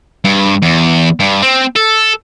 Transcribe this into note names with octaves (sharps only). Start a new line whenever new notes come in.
G2
E2
G2
C4
A4